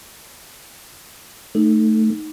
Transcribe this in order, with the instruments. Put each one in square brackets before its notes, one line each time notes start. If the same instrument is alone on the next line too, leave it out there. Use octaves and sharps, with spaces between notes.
[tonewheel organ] A3 [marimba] D#4